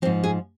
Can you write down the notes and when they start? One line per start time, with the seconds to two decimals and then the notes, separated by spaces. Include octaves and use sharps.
0.02 F3 C4
0.05 G#2
0.24 G#4